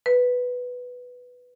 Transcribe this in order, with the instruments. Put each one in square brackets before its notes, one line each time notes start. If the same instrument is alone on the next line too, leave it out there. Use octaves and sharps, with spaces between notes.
[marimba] B4